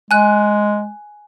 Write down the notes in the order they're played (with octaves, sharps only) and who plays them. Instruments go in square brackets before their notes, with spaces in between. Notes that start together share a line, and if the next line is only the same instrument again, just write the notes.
[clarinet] G#3 [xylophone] G#5 F#6